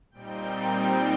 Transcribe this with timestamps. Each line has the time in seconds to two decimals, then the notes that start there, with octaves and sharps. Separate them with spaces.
0.11 A#2 G3 C4 D#4 G5